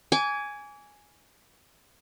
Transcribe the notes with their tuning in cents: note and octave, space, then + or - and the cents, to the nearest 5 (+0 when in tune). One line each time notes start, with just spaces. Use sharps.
G#5 +0 D6 -40